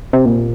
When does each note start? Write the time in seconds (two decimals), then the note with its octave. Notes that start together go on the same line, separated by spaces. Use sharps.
0.13 C3
0.25 A#2